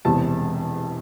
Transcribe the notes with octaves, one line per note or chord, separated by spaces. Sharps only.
E1 E2 C3 A5